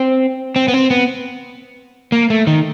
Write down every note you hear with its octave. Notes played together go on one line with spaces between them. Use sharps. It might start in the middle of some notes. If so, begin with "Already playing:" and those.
Already playing: C4
C4
B3
C4
B3
A#3
A3
D#3